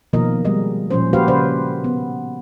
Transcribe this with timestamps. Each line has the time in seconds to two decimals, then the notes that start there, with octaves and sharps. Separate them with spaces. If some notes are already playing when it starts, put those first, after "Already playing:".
0.13 B2 D#3 F3 A#3 A#4 D#5
0.45 G3 G#3 D#5
0.91 A#2 F3 C#4 C5
1.13 A#3 F#4 G4 B4 C5 F5
1.28 C#3 C#4 B4 C5 D5
1.84 B3